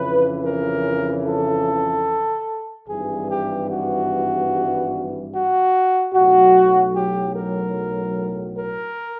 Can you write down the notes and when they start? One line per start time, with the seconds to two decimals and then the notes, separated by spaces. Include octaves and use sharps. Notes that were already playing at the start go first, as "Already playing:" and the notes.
Already playing: F2 C#3 E3 B4
0.45 A#4
1.27 A4
2.89 G#1 G2 E3 G3 G#4
3.30 G4
3.70 F#4
5.33 F#4
6.14 B1 A2 F#3 F#4
6.95 G4
7.35 A#4
8.57 A#4